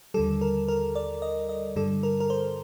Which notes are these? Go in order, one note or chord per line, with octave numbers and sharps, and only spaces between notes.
D#2 D3 G3 A4
A#4
A#4
D5
D#5
D#5
G2 D3 G3 A4
A#4
A#4
C5